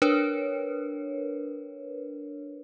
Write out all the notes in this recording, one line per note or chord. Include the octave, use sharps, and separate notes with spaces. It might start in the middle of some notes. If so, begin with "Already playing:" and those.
D4 A#4 B4 C#5